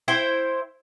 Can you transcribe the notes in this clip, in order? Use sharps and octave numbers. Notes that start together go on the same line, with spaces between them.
E4 C5 G5